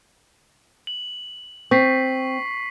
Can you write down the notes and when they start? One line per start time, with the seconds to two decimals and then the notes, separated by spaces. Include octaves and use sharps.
0.87 F#7
1.71 C4 C#6 B6 C7